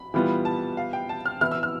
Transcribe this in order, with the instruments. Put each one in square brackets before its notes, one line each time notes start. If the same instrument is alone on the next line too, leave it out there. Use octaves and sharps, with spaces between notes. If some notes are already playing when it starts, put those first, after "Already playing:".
Already playing: [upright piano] B5
[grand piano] E3 G3 B3 F4
[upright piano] A5
F5
G5
A5
F6
[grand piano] E3 B3 E4 [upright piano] F6
[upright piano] E6
F6